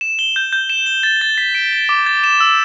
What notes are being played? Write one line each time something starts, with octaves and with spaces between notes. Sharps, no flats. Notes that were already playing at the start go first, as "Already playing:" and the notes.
E7
G7
G6
G6
E7
G7
A6
A6
B6
D7
G7
D6
A6
E7
E6